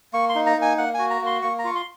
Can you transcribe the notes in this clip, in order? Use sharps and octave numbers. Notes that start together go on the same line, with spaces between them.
A#3 C#6
C6
D#4
A#5
A#3 G#5
A#3 F#5
F#4 G#5
A#5
A#3 C6
A#3 C#6
A#5
F4 C#6
C6